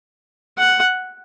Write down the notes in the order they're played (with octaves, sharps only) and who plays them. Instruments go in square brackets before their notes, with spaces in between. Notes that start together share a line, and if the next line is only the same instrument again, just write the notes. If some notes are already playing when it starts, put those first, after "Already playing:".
[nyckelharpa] F#5